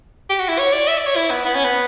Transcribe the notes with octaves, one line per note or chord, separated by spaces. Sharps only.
G4
F#4
E4
C#5
D5
E5
D5
C#5
E4
B3
B3
C#4
B3